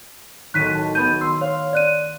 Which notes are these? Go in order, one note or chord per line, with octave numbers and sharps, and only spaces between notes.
B1 A2 D#3 F#6 B6 D#7
A5
A3 B3 G#4 G6 D#7
C6 E6
C#5 F5
D5 F#6 D#7